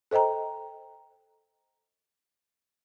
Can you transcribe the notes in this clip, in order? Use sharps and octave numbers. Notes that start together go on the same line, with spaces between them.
A4 C5 D#5 G5 A#5